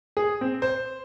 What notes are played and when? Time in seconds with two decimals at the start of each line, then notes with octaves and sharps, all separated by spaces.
0.17 G#4
0.41 C4
0.62 C5